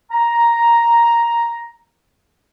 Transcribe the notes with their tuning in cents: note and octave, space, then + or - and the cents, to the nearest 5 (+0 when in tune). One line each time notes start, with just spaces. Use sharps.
A#5 +5